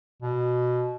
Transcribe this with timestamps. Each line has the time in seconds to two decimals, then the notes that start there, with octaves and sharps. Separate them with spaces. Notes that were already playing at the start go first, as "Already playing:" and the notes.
0.22 B2